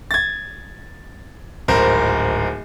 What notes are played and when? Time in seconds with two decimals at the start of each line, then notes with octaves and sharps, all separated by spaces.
0.11 G#6 A6
1.68 D1 G#1 A#4 C5